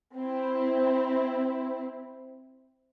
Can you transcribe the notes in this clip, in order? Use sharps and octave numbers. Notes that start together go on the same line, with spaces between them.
C4 E4